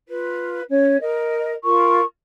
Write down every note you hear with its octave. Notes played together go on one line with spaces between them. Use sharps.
F4 B4
C#4 C#5
A#4 D#5
F4 A#4 C#6